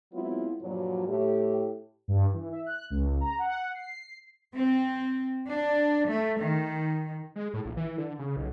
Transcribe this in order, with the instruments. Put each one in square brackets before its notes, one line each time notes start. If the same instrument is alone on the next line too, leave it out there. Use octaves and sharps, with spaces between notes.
[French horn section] F#3 G#3 B3 C4 E4 F4
G2 A#2 F3 F#3
A2 G4
[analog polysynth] G2
E3
E5
F#6
C#2
A#5
F#5
C7
[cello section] C4
D4
A3
D#3
[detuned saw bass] G#3
A2
A#1
E3
D3
C#3
B1